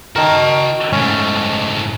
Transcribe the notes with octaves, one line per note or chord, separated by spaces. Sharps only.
D#3 F#4 A#4 A5
G#2 A3 C#4